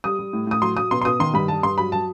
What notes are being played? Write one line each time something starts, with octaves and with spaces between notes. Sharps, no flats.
G3 D#6
G3
A2
A2 D#6
F#3 C6
F#3 D#6
B2 C6
C6
B2 D#6
D#3 C6
G2 B5
G3 A5
G2 C6
F#3 B5
F#3 A5